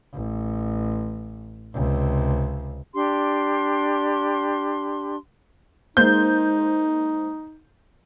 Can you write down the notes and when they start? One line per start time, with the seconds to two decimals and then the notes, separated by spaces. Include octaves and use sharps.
0.14 A1
1.73 C#2 C3
2.94 D4 G4 C6
5.97 G#3 A#3 D#4 C5 G6